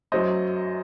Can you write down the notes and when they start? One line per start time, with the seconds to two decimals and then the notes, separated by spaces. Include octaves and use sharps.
0.12 F#2 F#3 A3 C5 D#5